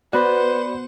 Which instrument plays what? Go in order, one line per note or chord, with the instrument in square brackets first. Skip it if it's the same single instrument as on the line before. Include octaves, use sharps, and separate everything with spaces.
[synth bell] B3 F#4 [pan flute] B4 [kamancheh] C5 [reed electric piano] D5 B5